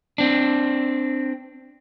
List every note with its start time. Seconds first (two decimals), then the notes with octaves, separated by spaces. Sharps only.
0.18 C4 D4